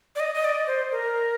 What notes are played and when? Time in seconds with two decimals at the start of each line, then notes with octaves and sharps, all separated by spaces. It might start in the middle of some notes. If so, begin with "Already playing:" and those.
0.16 D5
0.20 D#5
0.35 D#5
0.45 D5
0.67 C5
0.92 A#4